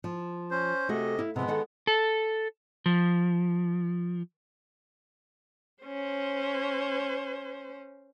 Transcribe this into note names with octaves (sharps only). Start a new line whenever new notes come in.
F3
C#4 C5
C3 A3 F#4 G#4 D#5
E4 F5
C3 F3 G#3 B3
D#3 A4 F#5
A4
F3
C#4 C5